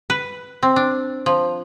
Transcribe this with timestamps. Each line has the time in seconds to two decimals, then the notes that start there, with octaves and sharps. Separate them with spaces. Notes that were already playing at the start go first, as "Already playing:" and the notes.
0.10 B4
0.63 C4
0.76 D4
1.26 F3